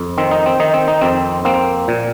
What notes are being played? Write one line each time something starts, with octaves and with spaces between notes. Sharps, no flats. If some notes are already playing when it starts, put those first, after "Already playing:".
Already playing: F2
D#3 C4
D#4
C4
D#3 D#4
C4
D#4
F2 C4
A#3 C4
A#2